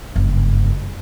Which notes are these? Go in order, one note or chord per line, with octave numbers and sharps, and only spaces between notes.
F#1 G2